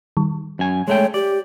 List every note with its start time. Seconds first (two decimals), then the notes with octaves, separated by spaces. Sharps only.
0.17 D#3 G3
0.59 F#2 G#5
0.88 G#3 A3 C#5 G5
1.14 G4 D5